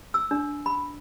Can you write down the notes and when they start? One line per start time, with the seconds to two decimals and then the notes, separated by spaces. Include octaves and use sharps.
0.14 E6
0.31 D4
0.66 B5